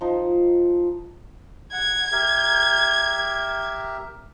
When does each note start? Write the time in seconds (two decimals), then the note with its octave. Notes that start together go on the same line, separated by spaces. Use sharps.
0.01 F3 D#4
1.72 F#5 G#6
2.12 G4 A#4 E5